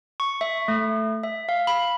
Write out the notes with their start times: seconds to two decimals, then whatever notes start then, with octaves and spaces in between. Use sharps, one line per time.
0.20 C#6
0.41 E5
0.68 A3
1.23 E5
1.49 F5
1.67 B5